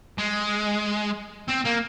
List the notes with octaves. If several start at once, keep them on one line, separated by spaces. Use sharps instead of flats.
G#3
C4
A#3